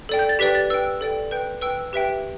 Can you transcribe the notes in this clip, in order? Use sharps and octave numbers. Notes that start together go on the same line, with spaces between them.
A4 D5 G5
G6
A6
G4 B4 D5 G5 B6
A6
B4 G5 E6
A4 D5 G5
B4 G5 G6
B4 G5 E6
G4 B4 E5 G5